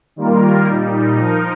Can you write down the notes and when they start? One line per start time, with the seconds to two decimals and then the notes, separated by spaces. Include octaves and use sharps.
0.16 D#3 G3 A#3 F4 A#4
0.67 A#2 G3 D#4
1.17 F3 D#4 A#4